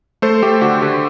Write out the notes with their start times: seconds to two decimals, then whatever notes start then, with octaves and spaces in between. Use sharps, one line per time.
0.22 A3 A4 C5
0.43 A3 G4
0.61 D3 F#4
0.82 D3 G4